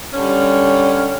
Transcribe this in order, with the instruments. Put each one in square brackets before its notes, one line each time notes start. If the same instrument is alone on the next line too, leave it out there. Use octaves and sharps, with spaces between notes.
[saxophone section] D3 G3 C#4